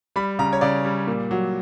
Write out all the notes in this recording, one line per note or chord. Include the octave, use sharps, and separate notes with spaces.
G3 B5
C#3 A#5
C#5
C#3 D5
G3
A#2
F#3